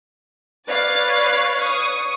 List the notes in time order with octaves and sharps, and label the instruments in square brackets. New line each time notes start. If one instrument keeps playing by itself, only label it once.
[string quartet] B4 C#5 F5 [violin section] D5 A6
[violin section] C#6 D#6